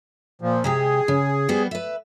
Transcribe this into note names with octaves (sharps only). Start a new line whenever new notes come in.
A#2 F3
C3 G#3 G4 G#4
C#3
G3 B3 C5
B4 E5